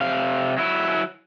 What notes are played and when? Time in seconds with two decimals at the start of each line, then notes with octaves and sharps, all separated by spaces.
0.01 C3 F5
0.58 F#3 E4